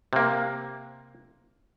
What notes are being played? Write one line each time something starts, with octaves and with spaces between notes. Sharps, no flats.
C3 A#3